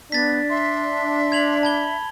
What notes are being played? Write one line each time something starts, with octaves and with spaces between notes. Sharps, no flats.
B3 D4 A6 B6
E5 C6
G#6 F7 F#7
A5 B5 G#6 G7